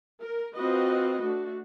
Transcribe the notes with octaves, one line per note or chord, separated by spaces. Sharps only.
A#4
C4 F4 F#4 B4 D#5
A3 D4 F#4